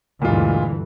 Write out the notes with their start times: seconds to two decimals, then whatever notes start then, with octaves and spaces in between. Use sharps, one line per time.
0.22 D2 G2 A#2 E3 G#3 F4